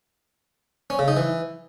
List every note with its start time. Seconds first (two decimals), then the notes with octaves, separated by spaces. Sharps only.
0.90 C#4
0.99 C#3
1.08 D#4
1.17 E3